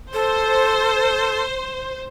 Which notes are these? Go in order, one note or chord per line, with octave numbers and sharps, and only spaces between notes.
A4 C5